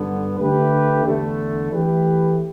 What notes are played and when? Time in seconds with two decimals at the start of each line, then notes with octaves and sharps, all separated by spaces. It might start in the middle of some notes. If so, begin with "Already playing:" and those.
Already playing: G2 D3 B3
0.37 D3 A3 G4 B4
1.04 E2 D3 A3
1.72 E3 A3 G4 B4